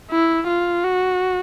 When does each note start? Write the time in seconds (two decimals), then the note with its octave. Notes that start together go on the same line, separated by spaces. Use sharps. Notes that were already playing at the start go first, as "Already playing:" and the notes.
0.11 E4
0.48 F4
0.84 F#4